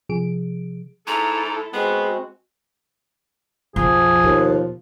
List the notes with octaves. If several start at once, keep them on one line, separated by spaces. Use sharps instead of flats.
C3 F3 G#4 D7
G#2 E4 A4 A#5
G#3 B3 C4 F#4 G#4
B1 F2 F3 G#4
D#2 B2